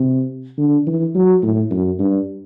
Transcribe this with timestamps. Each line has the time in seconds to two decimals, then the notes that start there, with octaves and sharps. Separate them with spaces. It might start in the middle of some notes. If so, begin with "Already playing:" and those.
Already playing: C3
0.58 D3
0.87 E3
1.15 F#3
1.43 A2
1.71 F#2
1.99 G2